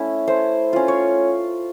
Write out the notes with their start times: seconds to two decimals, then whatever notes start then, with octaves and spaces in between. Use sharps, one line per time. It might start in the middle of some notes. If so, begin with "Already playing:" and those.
Already playing: A3 C#4 E4
0.28 A3 C5
0.73 C#4 F4
0.88 C#5